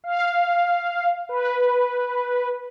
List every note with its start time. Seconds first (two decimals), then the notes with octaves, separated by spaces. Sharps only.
0.04 F5
1.29 B4